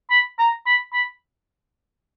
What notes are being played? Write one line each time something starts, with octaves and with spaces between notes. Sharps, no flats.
B5
A#5
B5
B5